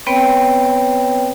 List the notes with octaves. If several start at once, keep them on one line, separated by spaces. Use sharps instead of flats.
B3 C4 B4 C#5 G5